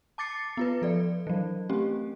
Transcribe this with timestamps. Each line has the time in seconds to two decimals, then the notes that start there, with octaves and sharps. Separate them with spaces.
0.18 A5 D6 A6 C7 C#7
0.57 B3 F4 B4
0.82 F3 A4 D5
1.27 E3 F#3
1.70 A3 C4 C#4 G4